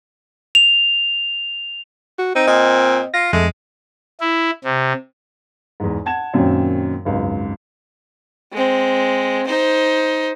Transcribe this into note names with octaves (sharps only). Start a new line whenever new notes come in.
F7
F#4
C4 D#4
A#2 D#5
F4 A#6
F2 G#3 A3
E4
C3
E2 G#2
F#5 A5 G#6 E7
F#2 A#2 D#3 F#3 C4 C#4
G#1 C#2 F#2
G#3 C4
D#4 C5